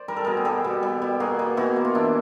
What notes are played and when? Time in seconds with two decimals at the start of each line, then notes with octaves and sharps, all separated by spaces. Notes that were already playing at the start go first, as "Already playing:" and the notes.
Already playing: C5 D5
0.08 G3 A#4
0.16 A4
0.24 B2 G#4 A#4
0.37 G#4
0.45 G3 G4 A4
0.64 B2
0.83 G3
1.02 B2
1.20 A#3 F#4 G#4
1.39 B2
1.57 B2 E4 F#4
1.76 A#3
1.85 F4
1.95 E3 D4 E4